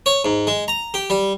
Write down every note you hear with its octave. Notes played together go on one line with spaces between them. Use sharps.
C#5
G#2
G#3
A#5
G4
G3